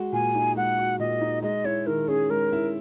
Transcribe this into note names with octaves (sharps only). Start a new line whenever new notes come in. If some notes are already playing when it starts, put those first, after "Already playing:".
Already playing: G#3 F#4
A#2 G#5
D#4
G#3 F#5
F#4
A#2 D#5
D#4
G#3 D#5
E4 C#5
D#3 A#4
C#4 G#4
G#3 A#4
E4